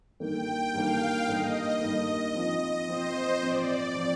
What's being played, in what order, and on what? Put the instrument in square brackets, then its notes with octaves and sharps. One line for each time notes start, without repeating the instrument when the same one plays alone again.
[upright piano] G2 D#3 A#3 [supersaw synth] G5
[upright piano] G2 D#3 A#3 [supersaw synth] F5
[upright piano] G2 D#3 A#3 [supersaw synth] D#5
[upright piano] G2 D#3 A#3 [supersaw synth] D#5
[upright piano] F3 C4 F4
[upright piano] F3 C4 F4 [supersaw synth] C5
[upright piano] F3 C4 F4 [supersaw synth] D5
[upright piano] F3 C4 F4